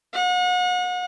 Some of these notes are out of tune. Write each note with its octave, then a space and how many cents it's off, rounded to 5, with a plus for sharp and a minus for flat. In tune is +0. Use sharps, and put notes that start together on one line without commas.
F#5 -35